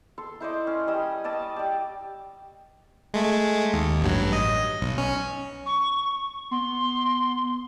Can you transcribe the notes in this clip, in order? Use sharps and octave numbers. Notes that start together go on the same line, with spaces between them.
A4 C6
E4 C5 D5 D#5
C#4
G3 D#5 D#6 E6
D5 D#5 A5 E6
G4 D5
G#3 A3
D#2
A1 G2 F#3
D#5
B1
C#4
C#6
B3 C6